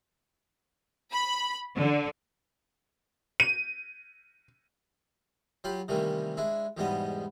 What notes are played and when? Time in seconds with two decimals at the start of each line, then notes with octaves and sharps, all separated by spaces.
1.12 B5
1.76 D3
3.40 D#7
5.64 F#3 F4 G4 F5 B5
5.88 C3 D#3 E3 G3 A3 A#3
6.37 G#3 D4 E4
6.77 E2 G#2 B2 G3 B3 D#5